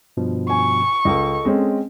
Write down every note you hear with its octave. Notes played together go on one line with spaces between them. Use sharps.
G2 B2 F3
G#5 C#6
C#2 A4 D#5
G#3 C4 C#4